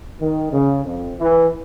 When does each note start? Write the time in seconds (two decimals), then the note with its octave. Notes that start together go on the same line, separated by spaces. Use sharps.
0.20 D#3
0.51 C#3
0.84 F2
1.19 E3